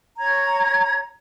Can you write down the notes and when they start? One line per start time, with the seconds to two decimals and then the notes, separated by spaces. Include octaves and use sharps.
0.19 C#5 A#5 G#6